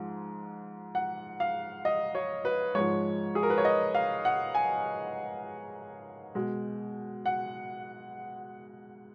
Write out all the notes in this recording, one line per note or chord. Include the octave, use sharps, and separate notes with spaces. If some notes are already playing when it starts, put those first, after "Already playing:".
Already playing: G#2 F3 G#3
F#5
F5
D#5
C#5
B4
G#2 F3 G#3 C#5
G#4
A#4
B4
C#5
D#5
F5
F#5
G#5
B2 G#3
F#5